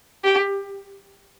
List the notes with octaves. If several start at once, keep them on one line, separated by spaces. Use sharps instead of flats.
G4